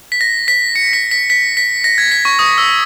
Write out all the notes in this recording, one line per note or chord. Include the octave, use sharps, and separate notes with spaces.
B6
A#6
B6
C#7
B6
B6
B6
B6
A#6
G#6
B6
C#6
D#6
E6